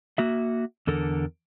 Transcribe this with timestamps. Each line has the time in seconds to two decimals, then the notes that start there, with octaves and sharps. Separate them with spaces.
0.18 A#3 F#4 E5
0.87 E2 D3 A4 A#4